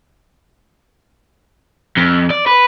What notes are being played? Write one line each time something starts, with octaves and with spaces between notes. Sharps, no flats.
F2
D5
B4